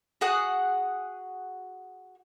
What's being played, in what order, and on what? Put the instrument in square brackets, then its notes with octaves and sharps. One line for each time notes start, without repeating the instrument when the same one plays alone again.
[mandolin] F#4 G#4 F#5 D#6